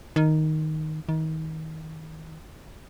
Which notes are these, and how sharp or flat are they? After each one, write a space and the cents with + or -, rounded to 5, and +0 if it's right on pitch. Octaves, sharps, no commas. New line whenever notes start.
D#3 +0
D#3 +30